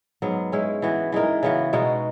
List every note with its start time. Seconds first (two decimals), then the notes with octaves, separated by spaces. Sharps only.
0.22 G#2 F#3 B3
0.52 G#3 C#4 E4
0.82 E3 B3 F#4
1.12 E3 G#3 D#4 A#4
1.43 C#3 E3 B3 F#4
1.73 B2 G#3 D#4 F#4